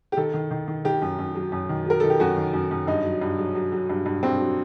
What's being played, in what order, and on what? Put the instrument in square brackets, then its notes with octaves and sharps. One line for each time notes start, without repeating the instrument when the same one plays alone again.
[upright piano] G4
D#3 A4
D#3
D#3
D#3
D#3 G4
F#2
F#2
F#3
F#2
D#3
F#3 A#4
D#3 A4
G4
F#2 F#4
D#3
F#2
F#2
G2 D#4
F#3
G2
F#3
F#3
F#3
G2
G2
G2 C4
F#3